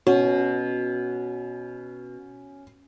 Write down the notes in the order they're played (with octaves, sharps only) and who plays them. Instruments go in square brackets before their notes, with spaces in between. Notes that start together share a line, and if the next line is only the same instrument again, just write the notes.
[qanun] B2 [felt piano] C#4 [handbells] F#4